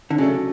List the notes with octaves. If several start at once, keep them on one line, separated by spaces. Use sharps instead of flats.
D3
C#3 F#3 A3 D4 A4